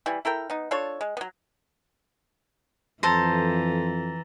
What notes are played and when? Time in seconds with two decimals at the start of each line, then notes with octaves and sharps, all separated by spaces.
0.06 E3 G3 E4
0.25 E4 A4 A#4 G5
0.50 B3 D#4
0.71 D4 F4 A4 C#5
1.01 G#3
1.17 F#3 B3
3.03 F2 E3 A4 C5 A#5 A6 A#6